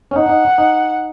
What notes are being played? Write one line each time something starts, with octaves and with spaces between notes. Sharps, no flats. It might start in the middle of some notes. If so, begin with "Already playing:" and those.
C#4
D#4 F#5
D#4
D#4